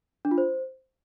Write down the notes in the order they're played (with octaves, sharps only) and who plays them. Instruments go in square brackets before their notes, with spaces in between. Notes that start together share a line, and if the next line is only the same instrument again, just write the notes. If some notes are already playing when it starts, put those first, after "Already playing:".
[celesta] D4
F4
C5